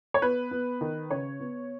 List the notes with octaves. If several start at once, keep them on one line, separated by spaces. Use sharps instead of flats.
C#5
B3 B4
B3
D#3
C#3 C#5
B3